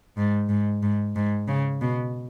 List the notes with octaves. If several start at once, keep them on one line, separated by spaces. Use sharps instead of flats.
G#2
G#2
G#2
G#2
C#3
B2